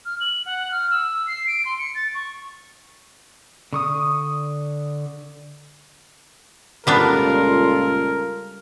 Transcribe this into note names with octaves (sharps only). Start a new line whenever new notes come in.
F6
F#7
F#5
F6
E6
C7
D7
C6
C#7
A6
C#6
D3 C#6 D#6
C#2 A#2 G3 B3 D4 F4 A4 A#4